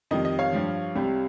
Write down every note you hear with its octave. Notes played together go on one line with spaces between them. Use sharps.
F2 D#3 G3 D#5
D#5
C#5 F5
G2 F3
C2 C3 G3